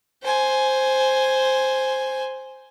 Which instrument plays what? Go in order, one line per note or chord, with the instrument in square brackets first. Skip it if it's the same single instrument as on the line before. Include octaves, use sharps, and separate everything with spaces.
[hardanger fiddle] C5 G#5